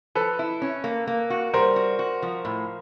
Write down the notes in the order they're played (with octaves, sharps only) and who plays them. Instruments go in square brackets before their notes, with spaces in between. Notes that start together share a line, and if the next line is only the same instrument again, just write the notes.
[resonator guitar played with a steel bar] F3 [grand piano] A4 B4
[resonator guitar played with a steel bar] E4
C#4
A#3
A#3
F#4
[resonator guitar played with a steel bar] G3 [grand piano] A#4 C5
[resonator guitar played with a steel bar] F#4
F#4
F3
A2